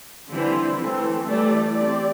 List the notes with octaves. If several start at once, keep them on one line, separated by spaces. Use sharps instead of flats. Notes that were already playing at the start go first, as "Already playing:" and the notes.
D3 E3 G3 C4 E4 C5
E3 A3 C4 A4
E3 G3 A3 E4 A4 D5
C4 G4 D5